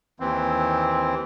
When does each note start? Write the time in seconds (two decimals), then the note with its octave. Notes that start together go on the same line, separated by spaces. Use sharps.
0.20 D#2 E3 C4